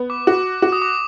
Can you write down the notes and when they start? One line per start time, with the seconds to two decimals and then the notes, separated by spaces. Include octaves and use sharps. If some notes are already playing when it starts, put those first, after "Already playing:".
Already playing: B3
0.10 D6
0.27 F#4 D6
0.62 F#4 D6
0.72 D#6
0.82 D6